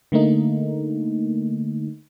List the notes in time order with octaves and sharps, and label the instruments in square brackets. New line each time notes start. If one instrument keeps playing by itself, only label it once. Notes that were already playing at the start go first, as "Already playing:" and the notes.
[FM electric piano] D3 A3 A#3 D#4